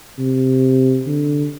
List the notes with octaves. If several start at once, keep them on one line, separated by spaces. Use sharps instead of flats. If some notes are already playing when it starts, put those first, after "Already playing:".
C3
D3